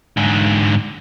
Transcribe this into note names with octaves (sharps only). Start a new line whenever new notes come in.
G#2 D3